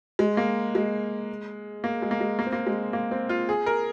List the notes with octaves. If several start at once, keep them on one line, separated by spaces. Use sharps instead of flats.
G#3
A#3
G#3
A#3
G#3
A#3
G#3
A#3
C4
A#3
G#3
A#3
C4
F4
G#4
A#4